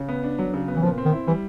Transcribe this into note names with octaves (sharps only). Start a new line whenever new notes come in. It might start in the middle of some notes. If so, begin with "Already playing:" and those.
Already playing: C#3
B3
D4
F#3
C#3
B3
E3
A#2 F3
C4
D#3
E4
E3 G3